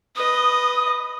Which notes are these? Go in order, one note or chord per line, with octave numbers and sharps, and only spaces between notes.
B4 D#5 D#6